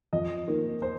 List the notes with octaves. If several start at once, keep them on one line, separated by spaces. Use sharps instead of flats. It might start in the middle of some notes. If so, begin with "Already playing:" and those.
F2 D#5
D#3 A#3
C5